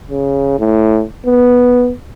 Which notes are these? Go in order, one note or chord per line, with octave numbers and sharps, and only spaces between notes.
C#3
A2
B3